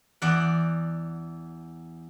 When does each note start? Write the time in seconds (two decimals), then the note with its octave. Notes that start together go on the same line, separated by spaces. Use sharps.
0.22 E2 D5 F#5